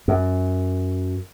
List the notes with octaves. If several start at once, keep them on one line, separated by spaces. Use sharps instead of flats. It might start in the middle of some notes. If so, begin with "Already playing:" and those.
F#2